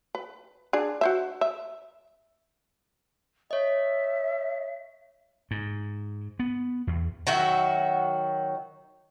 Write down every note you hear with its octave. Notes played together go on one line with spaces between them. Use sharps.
B4
D4 G#4
F#4 C5 E5
E5
C#5 D#5 E5
G#2
B3
E2
D#3 F#3 F#4 E5